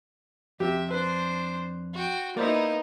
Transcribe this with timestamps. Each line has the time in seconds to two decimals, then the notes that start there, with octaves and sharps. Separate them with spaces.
0.60 F2 C3 G4 E5
0.90 D4 B4 C5
1.94 F#4 G5
2.37 A#3 B3 D#4 E4 C5 D5